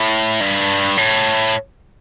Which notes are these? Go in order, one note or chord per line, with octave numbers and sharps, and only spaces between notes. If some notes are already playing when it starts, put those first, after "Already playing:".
Already playing: A2
G2
A2